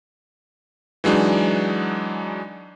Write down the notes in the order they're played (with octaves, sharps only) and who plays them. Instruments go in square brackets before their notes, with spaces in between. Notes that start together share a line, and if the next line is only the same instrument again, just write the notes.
[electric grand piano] E3 F#3 G#3 D4 D#4